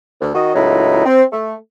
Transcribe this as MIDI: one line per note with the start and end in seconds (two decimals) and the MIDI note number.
0.21 0.33 38
0.35 0.53 51
0.35 0.53 66
0.35 0.53 75
0.55 1.05 37
0.55 1.05 45
0.55 1.05 54
0.55 1.05 63
0.55 1.05 64
1.06 1.23 60
1.32 1.54 57